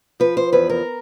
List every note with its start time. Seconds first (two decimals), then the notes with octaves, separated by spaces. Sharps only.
0.20 F3 B4
0.37 C5
0.53 E2 B4
0.69 A#4